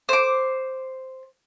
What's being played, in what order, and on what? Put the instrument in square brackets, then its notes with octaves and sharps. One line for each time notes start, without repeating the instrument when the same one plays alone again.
[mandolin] C5 D6